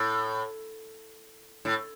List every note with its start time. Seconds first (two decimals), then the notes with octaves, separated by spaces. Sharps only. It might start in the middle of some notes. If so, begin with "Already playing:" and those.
Already playing: A2
1.65 A2